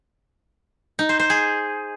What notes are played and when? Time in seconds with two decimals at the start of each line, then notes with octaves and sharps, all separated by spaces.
0.99 D#4
1.09 C5
1.19 C5
1.30 G#4